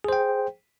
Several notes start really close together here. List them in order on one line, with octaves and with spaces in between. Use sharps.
G#4 C5 G5